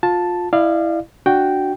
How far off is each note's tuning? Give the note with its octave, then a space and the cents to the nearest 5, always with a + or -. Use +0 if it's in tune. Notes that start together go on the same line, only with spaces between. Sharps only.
F4 +20 A5 +0
E4 +0 D5 +35 F5 -15
D4 +10 F#4 +0 G5 -5